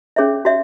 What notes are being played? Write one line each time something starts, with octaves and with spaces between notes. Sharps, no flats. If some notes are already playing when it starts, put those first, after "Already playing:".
C#4 G#4 C#5 E5
F#4 C#5 E5